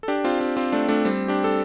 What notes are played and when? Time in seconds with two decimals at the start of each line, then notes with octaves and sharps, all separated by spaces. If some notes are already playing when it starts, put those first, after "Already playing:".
0.03 A4
0.08 D4 G4
0.24 C4 F4
0.40 C4 F4
0.57 C4 F4
0.72 A3 D4
0.88 A3 D4
1.05 G3 C4
1.28 D4 G4
1.44 A4